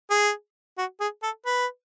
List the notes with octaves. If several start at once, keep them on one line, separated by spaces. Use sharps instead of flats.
G#4
F#4
G#4
A4
B4